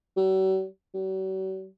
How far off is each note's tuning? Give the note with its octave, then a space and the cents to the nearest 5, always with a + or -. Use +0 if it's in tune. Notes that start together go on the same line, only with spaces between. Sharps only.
F#3 +45
F#3 +45